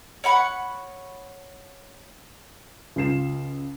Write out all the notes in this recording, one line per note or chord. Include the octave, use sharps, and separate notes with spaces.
C#5 F#5 B5 C#6
C#2 F4 C7 E7